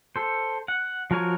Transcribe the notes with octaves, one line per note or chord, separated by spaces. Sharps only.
A4 C5
F#5
F3 F#4 A#4 C#5 G#5